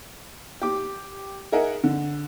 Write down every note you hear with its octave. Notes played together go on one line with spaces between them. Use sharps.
G4 D6
G#4 A#4 D#5 E5 F#5
D3